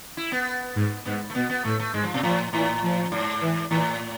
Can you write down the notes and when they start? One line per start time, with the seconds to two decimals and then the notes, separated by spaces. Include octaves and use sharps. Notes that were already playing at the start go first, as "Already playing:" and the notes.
0.17 E4
0.32 B3
0.76 G#2
1.05 G#2 B3
1.30 A3
1.35 B2 B3
1.50 B3
1.65 A2 A3
1.80 A3
1.93 G#2 G#3
2.04 F3
2.14 B2
2.23 A2 F3
2.53 A2 E3
2.83 F3
3.12 G#2
3.41 E3
3.71 A2 E3